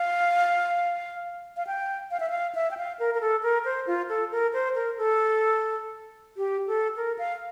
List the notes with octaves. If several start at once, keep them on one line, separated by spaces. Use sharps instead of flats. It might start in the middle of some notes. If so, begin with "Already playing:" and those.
Already playing: F5
F5
G5
F5
E5
F5
E5
G5
F5
A#4
A#4
A4
A#4
C5
F4
A4
A#4
C5
A#4
A4
G4
A4
A#4
F5